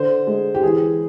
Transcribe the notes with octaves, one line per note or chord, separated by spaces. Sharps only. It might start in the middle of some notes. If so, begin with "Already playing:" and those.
Already playing: D3 C5
G#3
G4
E3 G#4